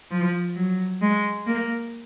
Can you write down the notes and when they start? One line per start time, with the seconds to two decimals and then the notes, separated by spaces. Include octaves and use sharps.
0.11 F3
0.56 F#3
1.02 G#3
1.47 A#3